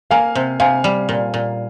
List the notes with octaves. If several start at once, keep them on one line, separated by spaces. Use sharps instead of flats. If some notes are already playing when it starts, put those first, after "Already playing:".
A#3 F5 G#5
C3
C3 F5 G#5
G3
A#2
A#2